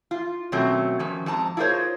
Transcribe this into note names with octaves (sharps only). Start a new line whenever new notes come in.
F4
B2 D#3 F#3 A3 C4 C#4
D#3 F3 C#4
F2 G#2 A5 A#5
E4 F4 G#4 A#4 C5 C#5